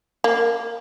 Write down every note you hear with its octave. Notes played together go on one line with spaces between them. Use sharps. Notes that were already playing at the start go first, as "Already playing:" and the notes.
A#3